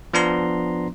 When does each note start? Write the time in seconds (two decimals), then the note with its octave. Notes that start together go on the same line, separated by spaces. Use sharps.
0.13 F3 B3 D4 A#5 C6